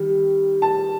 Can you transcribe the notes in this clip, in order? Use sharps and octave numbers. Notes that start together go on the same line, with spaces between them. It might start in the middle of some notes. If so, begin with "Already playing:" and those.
Already playing: D#3 G3
A5